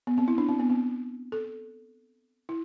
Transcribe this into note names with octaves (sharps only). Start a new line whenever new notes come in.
B3
C4
E4
D4
C4
B3
C4
A4
E4